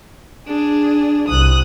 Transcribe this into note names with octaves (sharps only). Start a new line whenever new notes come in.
D4 G#4
C2 D#6 F#6